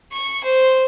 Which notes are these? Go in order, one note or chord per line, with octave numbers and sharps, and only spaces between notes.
C#6
C5